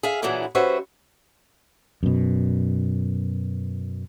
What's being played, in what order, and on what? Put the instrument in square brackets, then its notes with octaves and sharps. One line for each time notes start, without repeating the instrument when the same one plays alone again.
[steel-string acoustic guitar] G#4 E5 F5
A#2 D3 E3 F#3 E4 G#4
G3 C#4 F#4 B4 C5 E5
[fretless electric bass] F#2 B2